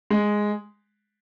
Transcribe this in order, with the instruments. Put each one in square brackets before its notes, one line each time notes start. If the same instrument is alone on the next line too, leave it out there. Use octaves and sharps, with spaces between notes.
[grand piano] G#3